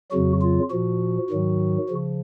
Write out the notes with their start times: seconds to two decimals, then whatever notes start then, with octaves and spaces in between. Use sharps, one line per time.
0.12 F2 C#3 F#3 F#4
0.42 F4
0.70 A#2 F3 F#4
1.30 G#2 D#3 F#3
1.89 C#3 F3